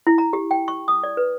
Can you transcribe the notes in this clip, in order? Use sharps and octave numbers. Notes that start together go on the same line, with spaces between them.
E4
A#5
G4
G5
C#6
D#6
D5
B4